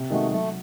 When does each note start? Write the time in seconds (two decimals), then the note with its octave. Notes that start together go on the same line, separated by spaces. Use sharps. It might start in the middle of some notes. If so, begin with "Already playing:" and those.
Already playing: C3
0.10 D#3 G#3 A3 D#4 F#4
0.30 F#3 A3